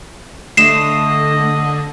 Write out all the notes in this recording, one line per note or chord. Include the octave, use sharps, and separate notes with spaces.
D3 A3 D#5 C7 E7